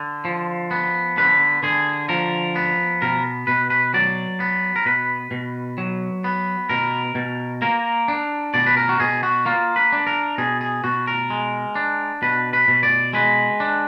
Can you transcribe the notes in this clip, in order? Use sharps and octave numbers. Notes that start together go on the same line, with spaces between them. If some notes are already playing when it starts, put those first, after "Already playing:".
Already playing: D3
F3
B3
D3 B4
D3 G#4
F3 A#4
B3
B2 A#4
B2 B4
B4
F#3 D5
B3
A#4
B2 B4
B2
F#3
B3
B2 A#4
B2
A#3 A#4
D4
B2 D5
B4
A#4
F#4
B2 G#4
F#4
A#3 F4
B4
D4
A#4
B2 G#4
G#4
B2 F#4
A#4
G#3
D4
B2 B4
B4
B2
D5
G#3 B4
D4